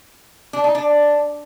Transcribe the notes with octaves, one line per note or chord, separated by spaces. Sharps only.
D4
D#4
D4